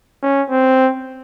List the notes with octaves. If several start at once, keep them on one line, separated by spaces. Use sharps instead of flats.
C#4
C4